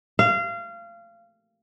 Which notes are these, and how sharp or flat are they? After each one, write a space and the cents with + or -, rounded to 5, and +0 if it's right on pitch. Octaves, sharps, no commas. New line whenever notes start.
F5 -25